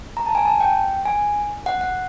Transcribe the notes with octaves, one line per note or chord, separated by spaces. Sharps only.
A#5
A5
G#5
A5
G5
G#5
F#5
F#5